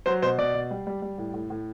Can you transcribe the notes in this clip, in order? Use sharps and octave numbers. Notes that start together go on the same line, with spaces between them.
F#3 C5
B2 C5
B2 D5
B2
G3
G3
G3
A2
A2
A2